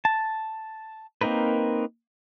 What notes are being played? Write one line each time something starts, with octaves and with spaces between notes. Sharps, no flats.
A5
A#3 C4 D#4 A#4 B4